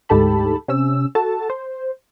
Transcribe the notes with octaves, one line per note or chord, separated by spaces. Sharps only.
D2 G#2 G4 A4 A5 B5
C3 C#4 E6
F#4 A4 A5
C5